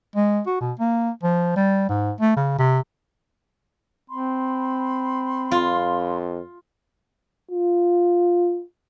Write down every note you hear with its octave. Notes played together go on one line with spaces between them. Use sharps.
G#3
F#4
B2
A#3
F3
G3
G#2
A3
C#3
C3
C4 B5 C6
F2 F4
F4